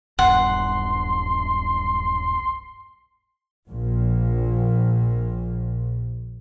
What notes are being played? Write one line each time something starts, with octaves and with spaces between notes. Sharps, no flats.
D#1 B1 G2 F#5 C6
A#1 A#2